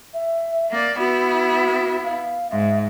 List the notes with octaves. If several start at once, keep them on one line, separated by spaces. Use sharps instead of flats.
E5
A#3 D5
B3 E4 F#4
F5
G#2 E5